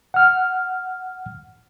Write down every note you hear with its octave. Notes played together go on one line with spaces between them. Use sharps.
F#5 F6